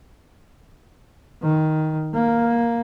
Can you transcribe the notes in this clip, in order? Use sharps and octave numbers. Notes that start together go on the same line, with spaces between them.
D#3
A#3